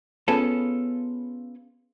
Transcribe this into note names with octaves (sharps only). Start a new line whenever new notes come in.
B3 C#4 F4 G#4 A4